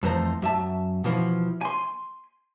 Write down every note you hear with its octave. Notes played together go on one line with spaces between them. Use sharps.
F2 E3 A3 C5 A#5
F#2 E5 A5
B2 E3 F3
G#5 C6